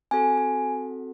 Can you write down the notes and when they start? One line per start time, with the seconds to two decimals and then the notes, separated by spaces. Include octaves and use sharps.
0.11 C4 F#4 A4 G#5
0.38 G#5